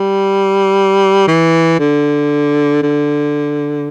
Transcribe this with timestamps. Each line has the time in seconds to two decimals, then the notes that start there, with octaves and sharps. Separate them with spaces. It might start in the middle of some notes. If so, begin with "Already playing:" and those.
Already playing: G3
1.28 E3
1.80 D3
2.83 D3